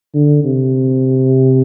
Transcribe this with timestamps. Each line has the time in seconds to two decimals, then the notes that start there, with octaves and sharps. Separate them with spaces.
0.14 D3
0.45 C3